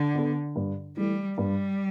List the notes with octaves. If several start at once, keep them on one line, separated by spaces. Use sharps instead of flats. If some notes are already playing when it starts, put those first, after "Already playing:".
Already playing: D3
B3 D4 A4
G2
E3 G3 A3
G2 G3